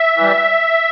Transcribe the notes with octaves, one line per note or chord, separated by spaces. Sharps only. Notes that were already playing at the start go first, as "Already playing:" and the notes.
Already playing: E5
E3 G3